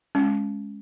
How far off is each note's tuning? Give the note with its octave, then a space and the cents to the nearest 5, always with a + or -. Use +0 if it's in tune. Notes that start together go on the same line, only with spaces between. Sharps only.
G#3 +0 C#4 +0